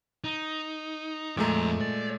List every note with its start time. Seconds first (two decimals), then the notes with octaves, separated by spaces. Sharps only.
0.24 D#4
1.37 F2 A#2 G#3 A3 A#5
1.81 D5